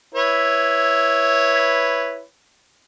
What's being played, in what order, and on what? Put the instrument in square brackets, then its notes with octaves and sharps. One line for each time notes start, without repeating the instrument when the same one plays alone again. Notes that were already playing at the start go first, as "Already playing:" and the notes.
[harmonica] E4 B4 C#5